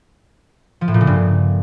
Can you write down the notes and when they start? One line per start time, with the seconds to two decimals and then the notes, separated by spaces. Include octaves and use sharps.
0.81 F3
0.88 A2
0.94 A#2
1.01 C#3
1.07 G2